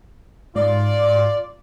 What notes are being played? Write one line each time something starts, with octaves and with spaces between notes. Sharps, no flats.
G#2 F4 D5